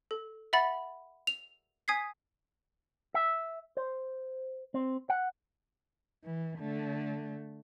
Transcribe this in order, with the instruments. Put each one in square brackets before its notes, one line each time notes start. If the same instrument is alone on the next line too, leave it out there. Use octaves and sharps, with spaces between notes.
[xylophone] A4
E5 F#5 B5 A6
F7
G#5 D#6 G#6 B6 C7
[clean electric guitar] E5
C5
C4
F#5
[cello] E3
D3 A3